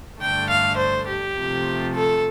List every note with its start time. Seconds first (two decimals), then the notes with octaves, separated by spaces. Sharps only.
0.20 G2 D3 A3 G5
0.49 F5
0.77 C5
1.07 G4
1.36 C3 F3 A3
1.94 A4